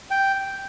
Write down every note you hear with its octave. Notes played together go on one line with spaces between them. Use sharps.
G5